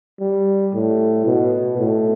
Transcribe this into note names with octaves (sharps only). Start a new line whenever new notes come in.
G3
A2
B2
A2